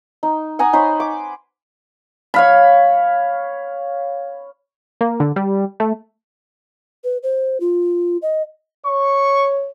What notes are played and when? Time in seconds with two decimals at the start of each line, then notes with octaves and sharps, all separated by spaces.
0.23 D#4
0.59 F#5 G#5 A#5 D#6
0.73 D#4 C5 C#5 B5
1.00 D6
2.34 C#5 F5 B5
5.01 A#3
5.20 D3
5.36 G3
5.80 A3
7.04 B4
7.23 C5
7.60 F4
8.22 D#5
8.86 C#5 C#6